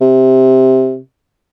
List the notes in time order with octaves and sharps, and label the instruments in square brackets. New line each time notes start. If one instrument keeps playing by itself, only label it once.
[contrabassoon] C3